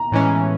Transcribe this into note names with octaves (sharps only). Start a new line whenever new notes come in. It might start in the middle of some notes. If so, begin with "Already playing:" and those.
Already playing: A#5
A2 E3 G#3 C#4